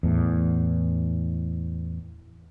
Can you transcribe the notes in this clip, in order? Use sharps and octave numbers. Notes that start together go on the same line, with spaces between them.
E2 A2